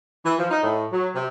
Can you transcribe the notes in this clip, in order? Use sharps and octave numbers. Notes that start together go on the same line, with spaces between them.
E3
F3
D#4
A2
F#3
C3